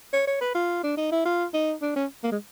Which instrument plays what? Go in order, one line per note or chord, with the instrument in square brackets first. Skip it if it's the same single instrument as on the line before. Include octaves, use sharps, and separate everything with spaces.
[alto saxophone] C#5
C#5
B4
F4
D4
D#4
E4
F4
D#4
D4
C#4
A#3
G#3